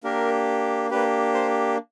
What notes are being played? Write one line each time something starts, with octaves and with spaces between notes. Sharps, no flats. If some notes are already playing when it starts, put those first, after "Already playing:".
A#3 D4 G4 A#4
A#3 D4 G4 B4
C5